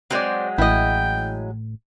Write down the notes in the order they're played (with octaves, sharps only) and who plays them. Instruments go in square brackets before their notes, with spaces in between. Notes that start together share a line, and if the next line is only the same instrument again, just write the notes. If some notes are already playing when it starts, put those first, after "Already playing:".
[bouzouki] F#3 G#3 [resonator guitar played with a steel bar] C4 C5 D5
[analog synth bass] A1 [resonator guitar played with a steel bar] E4 D#5 [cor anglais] G5